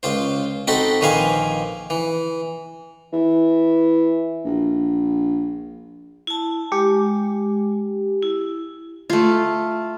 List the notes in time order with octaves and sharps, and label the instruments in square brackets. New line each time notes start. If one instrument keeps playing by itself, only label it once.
[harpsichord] C#2 F4 C5
C4 D#4 F#4 A4 B5
A#1 D#3 B4 C5 F5 G#5
E3
[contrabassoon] E3
A#1
[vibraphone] E4 A5
[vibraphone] G#3 [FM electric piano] G4
[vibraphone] E4
[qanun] A3 F4